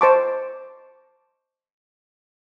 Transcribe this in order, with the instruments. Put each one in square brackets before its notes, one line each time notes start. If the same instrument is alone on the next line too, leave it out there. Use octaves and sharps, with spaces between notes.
[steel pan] C5 D#5 A5 C#6 D6